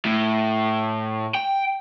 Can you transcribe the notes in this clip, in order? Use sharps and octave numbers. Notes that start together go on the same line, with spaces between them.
A2
G5